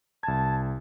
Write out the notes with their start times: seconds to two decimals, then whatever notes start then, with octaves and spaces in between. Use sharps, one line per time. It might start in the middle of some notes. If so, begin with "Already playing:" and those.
0.23 C2 A5 G#6